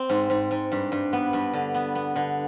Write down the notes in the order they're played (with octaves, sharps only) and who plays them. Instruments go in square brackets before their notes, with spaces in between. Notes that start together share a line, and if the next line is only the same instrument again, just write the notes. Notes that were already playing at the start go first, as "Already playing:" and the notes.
Already playing: [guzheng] C4
G#2
G#2
G#2
G2
G2
B3
G2
D3
B3
B3
D3